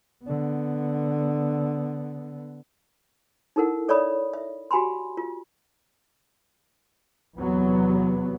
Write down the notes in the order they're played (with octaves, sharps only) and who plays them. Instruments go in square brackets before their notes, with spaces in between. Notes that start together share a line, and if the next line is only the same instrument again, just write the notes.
[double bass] D3 B3
[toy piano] D#4 E4 A4 A#4 F#5
A4 C#5 D5 E5 B5 D#6
E5
F#4 G4 G#5 B5 C6
F4
[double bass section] E2 C3 F#3 B3